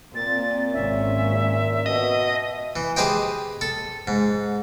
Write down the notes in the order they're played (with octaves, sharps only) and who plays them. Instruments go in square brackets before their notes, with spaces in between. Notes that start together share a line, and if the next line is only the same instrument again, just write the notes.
[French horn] A#2 [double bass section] A#3 C4 [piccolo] A6
[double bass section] G#1 C#4 [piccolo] E5
[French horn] B2 [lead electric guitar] D#5
[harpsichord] E3
G4 G#4 B4 C5 D#5 G5
A4
G#2